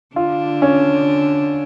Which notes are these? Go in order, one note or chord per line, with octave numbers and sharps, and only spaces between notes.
D3 D4 F4
C#4